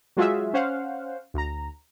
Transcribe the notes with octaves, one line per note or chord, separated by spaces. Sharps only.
F#3 G#3 F4 F#4 G#4 E5
C#4 C5 F5 F#5
D2 A#5